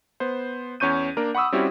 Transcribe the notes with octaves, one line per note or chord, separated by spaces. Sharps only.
B3 C5
E2 C#4 C#6 G6 D#7
A#3 D4 A#4
F#5 B5 C#6 D#6 E6
G3 C4 C#4 E4 F#4 G4